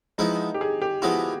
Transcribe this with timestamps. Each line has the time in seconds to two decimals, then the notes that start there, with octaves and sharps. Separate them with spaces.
0.18 F3 G#3 B3 D#4 E4
0.54 G4
0.61 G#4
0.82 G4
1.02 F3 G#3 B3 E4 F#4